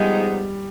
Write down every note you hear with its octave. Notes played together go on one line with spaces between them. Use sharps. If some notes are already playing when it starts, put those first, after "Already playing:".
Already playing: G#2 F3 G3 G#3 B3 D#4